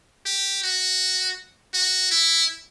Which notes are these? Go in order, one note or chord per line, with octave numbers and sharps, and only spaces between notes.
G4
F#4
F#4
E4